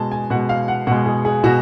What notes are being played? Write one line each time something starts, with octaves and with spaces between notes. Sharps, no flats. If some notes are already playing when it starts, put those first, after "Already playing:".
Already playing: B2 G#3 A5
G#5
B2 G#3 F#5
F5
F#5
B2 G#3 F#5
G#4
G#4
B2 F#4